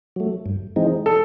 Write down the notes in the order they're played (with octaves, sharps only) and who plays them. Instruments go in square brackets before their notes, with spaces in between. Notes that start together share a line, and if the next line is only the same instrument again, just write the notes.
[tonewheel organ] F#3 A3
G2
E3 G#3 C4 D#4
[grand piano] A4